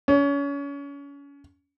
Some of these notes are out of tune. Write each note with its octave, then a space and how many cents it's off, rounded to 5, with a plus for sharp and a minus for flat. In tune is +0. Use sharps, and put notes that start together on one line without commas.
C#4 +30